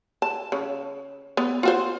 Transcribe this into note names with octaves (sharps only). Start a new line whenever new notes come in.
A5
C#3
B3
F4 F#4 C5